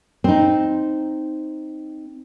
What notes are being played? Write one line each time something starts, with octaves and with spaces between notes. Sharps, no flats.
C4 D#4